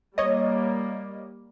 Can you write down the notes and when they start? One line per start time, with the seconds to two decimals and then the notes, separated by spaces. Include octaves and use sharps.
0.18 G3 A#3 C#5 D#5